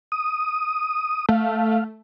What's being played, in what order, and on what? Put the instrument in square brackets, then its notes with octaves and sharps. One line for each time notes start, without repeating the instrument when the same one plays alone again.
[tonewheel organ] D#6
[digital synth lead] A3 [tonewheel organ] F5